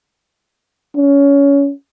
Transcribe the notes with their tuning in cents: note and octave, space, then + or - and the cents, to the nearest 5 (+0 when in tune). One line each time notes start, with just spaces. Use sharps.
C#4 +20